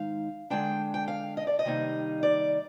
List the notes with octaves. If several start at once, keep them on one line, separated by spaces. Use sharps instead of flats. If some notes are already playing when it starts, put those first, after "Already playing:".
Already playing: G#2 D#3 G#3 D#4 F5
D3 G#3 D4 G5
G5
F5
D#5
D5
D#5
C3 D#3 G3 A#3 D#4
D5